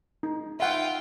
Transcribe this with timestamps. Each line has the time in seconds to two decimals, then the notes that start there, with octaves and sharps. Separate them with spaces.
0.23 D#4
0.60 F4 E5 F#5 G5